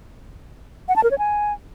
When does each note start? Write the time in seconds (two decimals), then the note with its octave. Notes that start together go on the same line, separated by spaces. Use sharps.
0.88 F#5
0.96 A5
1.03 A#4
1.11 C#5
1.18 G#5